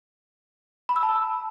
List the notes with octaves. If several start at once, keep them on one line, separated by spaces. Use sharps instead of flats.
B5
E6
A5